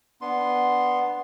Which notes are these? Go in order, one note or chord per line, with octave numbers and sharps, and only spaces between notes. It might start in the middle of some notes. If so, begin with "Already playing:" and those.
B3 D4 C6